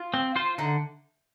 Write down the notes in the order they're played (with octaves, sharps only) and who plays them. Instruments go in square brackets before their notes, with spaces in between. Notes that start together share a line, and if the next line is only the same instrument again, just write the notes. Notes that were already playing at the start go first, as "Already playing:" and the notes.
Already playing: [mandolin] F4
[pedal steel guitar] C4
F4 C5
[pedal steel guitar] D3 [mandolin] D#4